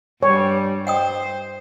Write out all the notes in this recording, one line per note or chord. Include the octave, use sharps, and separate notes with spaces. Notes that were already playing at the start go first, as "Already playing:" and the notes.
G2 G3 C#5
C5 F#5 G5 D#6